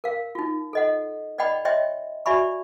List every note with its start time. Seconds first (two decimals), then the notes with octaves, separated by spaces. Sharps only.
0.04 A#4 F5
0.35 D#4 F4
0.73 A4 D#5 F#5
1.38 D5 D#5 F#5 G5 B5
1.65 C#5 D#5 E5 G5 C6
2.26 F#4 D5 E5 G#5 B5 C#6